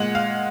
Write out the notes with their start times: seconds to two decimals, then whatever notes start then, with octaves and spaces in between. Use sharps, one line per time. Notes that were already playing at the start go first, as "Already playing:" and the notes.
Already playing: A#2 G#3 F#5
0.15 F5